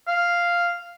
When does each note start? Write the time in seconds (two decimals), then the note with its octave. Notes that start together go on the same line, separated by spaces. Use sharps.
0.08 F5